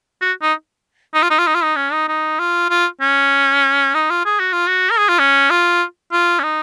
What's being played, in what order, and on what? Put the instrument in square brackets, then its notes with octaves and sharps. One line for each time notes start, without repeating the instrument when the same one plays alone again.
[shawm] F#4
D#4
D#4
F4
D#4
F4
D#4
F4
D#4
C#4
D#4
D#4
F4
F4
C#4
D#4
F4
G#4
F#4
F4
F#4
A#4
G#4
F4
C#4
F4
F4
C#4
D#4